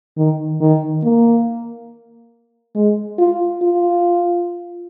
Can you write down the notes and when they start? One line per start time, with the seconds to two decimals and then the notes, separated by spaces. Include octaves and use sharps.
0.17 D#3
0.61 D#3
1.04 A#3
2.75 G#3
3.19 F4
3.62 F4